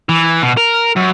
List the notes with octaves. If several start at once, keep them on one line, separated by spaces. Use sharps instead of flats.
E3
B2
A#4
F#2